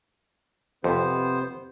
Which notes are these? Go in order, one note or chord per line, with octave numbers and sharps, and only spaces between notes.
F2 C3 B3 C5